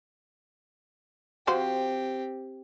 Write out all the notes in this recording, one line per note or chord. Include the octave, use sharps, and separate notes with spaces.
F3 C4 F#4 G4 C5